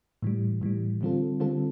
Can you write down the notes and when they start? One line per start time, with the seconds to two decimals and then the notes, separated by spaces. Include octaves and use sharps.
0.23 A2 E3 G3
0.61 A2 E3 G3
1.01 D3 G3 C4 F4 A4
1.40 D3 G3 C4 F4 A4